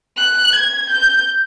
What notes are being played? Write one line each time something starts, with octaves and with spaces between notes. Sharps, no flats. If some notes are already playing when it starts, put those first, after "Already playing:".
F#6
G#6
G6